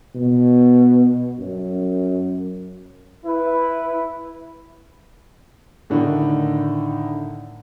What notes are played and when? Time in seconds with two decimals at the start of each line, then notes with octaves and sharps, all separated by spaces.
0.15 B2
1.39 F#2
3.24 E4 B4
5.90 A2 D3 D#3 D#4